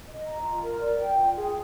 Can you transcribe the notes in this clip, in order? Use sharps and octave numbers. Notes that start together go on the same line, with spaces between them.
D#5
A#5
F4
A#4
D5
G5
F4
G#4